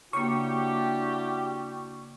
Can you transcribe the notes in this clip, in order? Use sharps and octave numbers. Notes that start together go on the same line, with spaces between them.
C#3 G3 A#3 D4 E4 F#4 G4 C#6